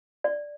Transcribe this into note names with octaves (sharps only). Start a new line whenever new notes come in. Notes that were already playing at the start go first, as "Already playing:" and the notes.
D5